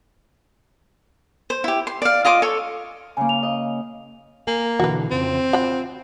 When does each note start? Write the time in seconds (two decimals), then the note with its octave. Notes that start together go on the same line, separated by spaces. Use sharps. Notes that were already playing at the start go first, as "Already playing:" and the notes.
1.50 C5
1.64 E4 G4
1.87 C6
2.02 D5 F5
2.25 F4 D#5 C6 D6
2.42 A4 C#5 C#6
3.17 C#3 A#3 G#5
3.29 F7
3.43 D#5
4.47 A#3 G#5
4.79 B2 D3 E3 F#4 B4
5.11 F2 C#3 F3 C4
5.53 F4 F#5 B5